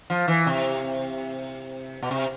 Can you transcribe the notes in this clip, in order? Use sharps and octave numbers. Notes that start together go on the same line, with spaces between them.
F3
E3
C3
B2
C3